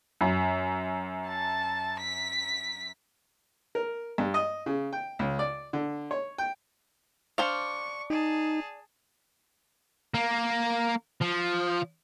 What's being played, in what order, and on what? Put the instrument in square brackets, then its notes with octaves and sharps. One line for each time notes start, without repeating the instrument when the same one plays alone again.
[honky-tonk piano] F#2
[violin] A5
B6
[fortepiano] A#4
G2
D#5
C#3
G5
C#2
D5
D3
C#5
G5
[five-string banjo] D4 C5 F5 [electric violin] C#6
[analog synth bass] D#4 [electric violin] G#4 A5
[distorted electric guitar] A#3
F3